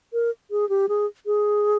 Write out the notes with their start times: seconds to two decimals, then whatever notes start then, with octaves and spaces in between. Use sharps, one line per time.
0.13 A#4
0.51 G#4
0.69 G4
0.89 G#4
1.26 G#4